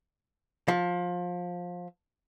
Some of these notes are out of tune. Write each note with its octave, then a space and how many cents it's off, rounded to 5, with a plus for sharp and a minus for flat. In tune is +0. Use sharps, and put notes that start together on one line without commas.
F3 +20